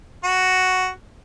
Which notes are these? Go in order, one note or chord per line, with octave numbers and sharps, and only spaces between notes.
F#4